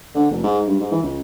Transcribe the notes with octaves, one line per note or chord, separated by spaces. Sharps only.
D3
F1
G#2
G2
G#2
E3
C#2